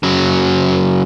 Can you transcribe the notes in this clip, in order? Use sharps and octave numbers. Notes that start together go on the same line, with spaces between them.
C#3 F#3